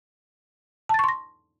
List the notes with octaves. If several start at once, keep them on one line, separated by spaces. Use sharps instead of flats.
A5 C6 C#6 A6 A#6